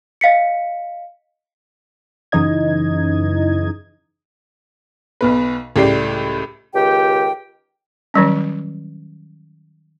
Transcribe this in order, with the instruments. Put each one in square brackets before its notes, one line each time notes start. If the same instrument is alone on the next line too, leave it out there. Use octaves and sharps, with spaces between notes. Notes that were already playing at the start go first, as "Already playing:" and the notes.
[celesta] D#5 F5 B6 C#7
[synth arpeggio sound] F#2 C#3 E3 D#4 D#5 G#6
[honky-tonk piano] B1 B2 B4
C#2 A2 G3 G4 D5 C7
[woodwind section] C#2 D#3 G4 G5
[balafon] D#3 F#3 G3 C#4